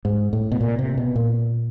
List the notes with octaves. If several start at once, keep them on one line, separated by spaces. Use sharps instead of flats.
G#2
A2
B2
A#2
C3
B2
A#2